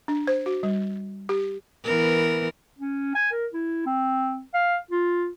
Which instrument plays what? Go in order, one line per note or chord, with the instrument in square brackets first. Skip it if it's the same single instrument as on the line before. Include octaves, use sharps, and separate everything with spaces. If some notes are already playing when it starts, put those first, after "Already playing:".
[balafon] D4
C5
F#4
G3
G4
[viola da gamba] E3 B3 A#4
[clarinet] C#4
G#5
A#4
E4
C4
F5
F4